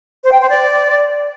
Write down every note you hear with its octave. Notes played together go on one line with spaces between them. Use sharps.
C5
G5
C5
D5